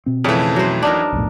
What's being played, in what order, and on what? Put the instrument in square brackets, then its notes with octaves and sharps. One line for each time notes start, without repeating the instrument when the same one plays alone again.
[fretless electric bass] B2 C4
[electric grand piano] F2 E3 [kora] C#3 A3
[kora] F#3 C5
D4 D#4 A#4
[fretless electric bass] B1 F2 A2